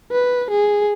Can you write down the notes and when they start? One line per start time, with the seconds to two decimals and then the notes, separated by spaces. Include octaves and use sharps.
0.12 B4
0.51 G#4